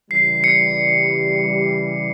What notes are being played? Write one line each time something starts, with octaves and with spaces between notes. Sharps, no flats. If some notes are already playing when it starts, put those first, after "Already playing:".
C#3 E3 G3 C7
C#7